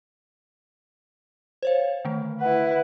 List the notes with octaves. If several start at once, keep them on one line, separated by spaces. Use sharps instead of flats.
C5 C#5 F5
D3 D#3 A3
E4 B4 F#5